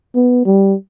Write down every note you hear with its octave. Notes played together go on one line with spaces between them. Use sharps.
B3
G3